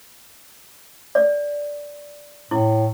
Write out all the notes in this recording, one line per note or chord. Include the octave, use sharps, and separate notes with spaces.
D5
A2 E4